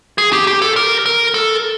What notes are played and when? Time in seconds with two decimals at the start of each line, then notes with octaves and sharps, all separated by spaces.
0.18 G#4
0.33 G4
0.47 G4
0.62 A4
0.76 A#4
1.06 A#4
1.34 A4